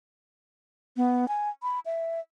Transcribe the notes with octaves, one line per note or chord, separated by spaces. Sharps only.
B3
G#5
B5
E5